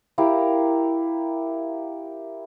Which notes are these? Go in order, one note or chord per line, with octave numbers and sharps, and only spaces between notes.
E4 G4 A#4 F5